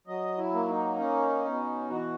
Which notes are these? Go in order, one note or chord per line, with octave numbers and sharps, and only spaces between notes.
F#3 D#5
E4
A#3
D#4
C#4
B2
E3 F#4